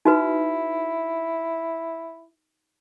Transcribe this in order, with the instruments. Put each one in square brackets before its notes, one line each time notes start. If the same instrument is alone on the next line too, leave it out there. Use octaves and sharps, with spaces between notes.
[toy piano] D#4 F#4 B4 [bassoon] E4